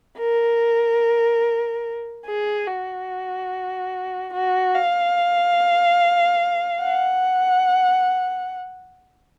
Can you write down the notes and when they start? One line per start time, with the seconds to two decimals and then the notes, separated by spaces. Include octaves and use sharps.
0.19 A#4
2.26 G#4
2.67 F#4
4.33 F#4
4.75 F5
6.82 F#5